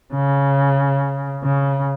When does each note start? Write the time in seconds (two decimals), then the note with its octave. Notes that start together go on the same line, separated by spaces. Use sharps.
0.14 C#3
1.44 C#3